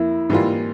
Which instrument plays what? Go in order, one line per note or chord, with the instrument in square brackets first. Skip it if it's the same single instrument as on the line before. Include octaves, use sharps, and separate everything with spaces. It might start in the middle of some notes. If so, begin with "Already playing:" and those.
Already playing: [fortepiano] F2 A#3 [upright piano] E4
[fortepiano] G#2 E3 G3 A#3 F4